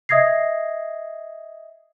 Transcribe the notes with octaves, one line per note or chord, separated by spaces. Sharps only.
D#5 E5 D#6 G#6 A#6 C7